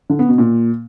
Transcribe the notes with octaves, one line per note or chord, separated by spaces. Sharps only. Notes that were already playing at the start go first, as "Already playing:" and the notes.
D3
B3
B2
A#2